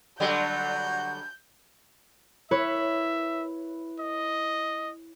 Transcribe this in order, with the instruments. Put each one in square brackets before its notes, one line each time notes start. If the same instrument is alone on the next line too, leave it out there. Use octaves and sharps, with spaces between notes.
[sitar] D3 F#3 G3 [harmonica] F#4 [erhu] G6
[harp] E4 B4 C#5 [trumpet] E5
[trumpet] D#5